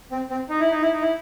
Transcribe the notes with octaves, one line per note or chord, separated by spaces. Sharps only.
C4
C4
D#4
E4
D#4
E4
D#4
E4